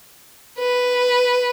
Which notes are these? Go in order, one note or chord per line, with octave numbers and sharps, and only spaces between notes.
B4